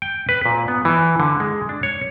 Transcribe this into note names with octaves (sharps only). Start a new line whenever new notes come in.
G5
B4
A#2
B3
E3
D3
G#3
D4
C#5